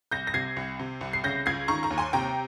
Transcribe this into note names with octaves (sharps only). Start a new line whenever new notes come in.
C2 G6 A#6
A#6
C3 G#6 C7
C2
C3
C2
C7
C#3 G6 A#6
C#2 G#6 C7
D#3 A#5 C#6
A#5 C#6
D#2
G#5 C6
C3 G5 A#5